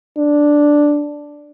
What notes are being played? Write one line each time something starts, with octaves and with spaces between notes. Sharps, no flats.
D4